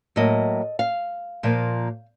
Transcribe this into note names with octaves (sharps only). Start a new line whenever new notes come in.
A2 F#3 A#3 D#5
F5
A#2 F3 A#3